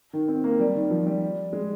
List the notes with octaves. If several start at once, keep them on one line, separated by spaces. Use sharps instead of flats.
D#3
C4
A#3
G3
D#3
F3
G3
G#3